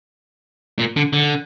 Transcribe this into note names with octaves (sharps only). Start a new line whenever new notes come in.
A#2
D3
D3